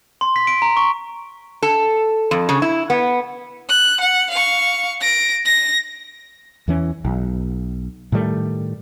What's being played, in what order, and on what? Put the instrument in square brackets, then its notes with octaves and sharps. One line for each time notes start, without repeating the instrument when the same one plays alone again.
[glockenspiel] C6
B6
D7
A#5
C#6
[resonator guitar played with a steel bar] A4
F2
C#3
E4
B3
[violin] F#6
F#5
F5 C#6
A#6 D7
A#6
[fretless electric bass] E2 E3 C#4
B1
A2 D#3 G3 A3